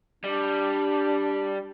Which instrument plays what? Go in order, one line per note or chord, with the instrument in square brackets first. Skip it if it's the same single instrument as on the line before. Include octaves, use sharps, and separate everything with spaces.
[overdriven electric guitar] G3 [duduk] D4